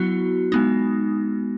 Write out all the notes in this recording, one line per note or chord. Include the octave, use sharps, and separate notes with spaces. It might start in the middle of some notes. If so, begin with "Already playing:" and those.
Already playing: F#3 B3 E4 F#4
G#3 B3 D#4